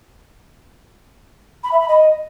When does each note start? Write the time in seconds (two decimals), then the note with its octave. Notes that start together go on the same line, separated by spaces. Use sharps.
1.63 B5
1.71 E5
1.80 B5
1.88 D#5